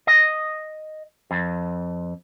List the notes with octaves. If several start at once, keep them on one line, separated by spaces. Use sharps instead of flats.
D#5
F2